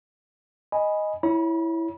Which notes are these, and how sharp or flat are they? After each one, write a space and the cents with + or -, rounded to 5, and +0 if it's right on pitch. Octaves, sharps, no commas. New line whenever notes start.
D#5 +0 G#5 +0 B5 +0
E4 +0 C#5 +0 B5 -45